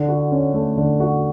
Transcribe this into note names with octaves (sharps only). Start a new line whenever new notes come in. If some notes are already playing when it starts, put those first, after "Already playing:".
Already playing: D3
F#4
C#4
A3
D3
F#4